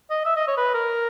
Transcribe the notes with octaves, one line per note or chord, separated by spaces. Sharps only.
D#5
E5
D#5
C#5
B4
A#4